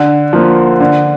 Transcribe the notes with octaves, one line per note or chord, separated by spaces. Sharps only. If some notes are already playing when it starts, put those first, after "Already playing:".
Already playing: D3
F3 A#3
D3